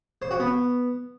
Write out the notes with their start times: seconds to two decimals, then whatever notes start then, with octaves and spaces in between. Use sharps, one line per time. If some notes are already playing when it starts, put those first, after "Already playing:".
0.22 C5
0.31 F#4
0.40 B3